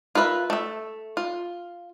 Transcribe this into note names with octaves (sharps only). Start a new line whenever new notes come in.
F4 A#4 B4 E5
A3 E5
F4